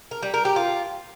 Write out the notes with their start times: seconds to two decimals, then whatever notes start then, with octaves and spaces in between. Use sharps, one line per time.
0.11 A#4
0.22 G3
0.34 A#4
0.45 G4
0.56 F4